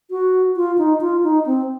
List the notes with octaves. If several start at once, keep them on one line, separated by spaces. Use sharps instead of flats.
F#4
F4
D#4
F4
D#4
C4